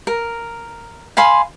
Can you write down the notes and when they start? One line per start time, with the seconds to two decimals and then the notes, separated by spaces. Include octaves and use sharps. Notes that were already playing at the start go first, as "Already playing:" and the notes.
0.07 A#4
1.17 F5 G#5 B5 C6